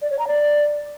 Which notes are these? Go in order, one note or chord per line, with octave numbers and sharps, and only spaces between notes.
D5
C#5
A#5
D5